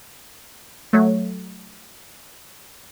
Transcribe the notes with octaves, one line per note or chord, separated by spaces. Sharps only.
F#3 A3